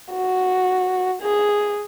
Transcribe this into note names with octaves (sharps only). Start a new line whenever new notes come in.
F#4
G#4